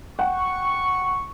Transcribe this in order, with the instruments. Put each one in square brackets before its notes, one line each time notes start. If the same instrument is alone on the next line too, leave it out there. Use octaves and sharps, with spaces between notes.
[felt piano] F#5 G5 [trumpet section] C#6